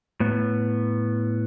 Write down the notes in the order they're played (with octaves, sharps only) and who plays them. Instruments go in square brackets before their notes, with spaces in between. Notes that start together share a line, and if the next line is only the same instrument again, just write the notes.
[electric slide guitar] A2 B3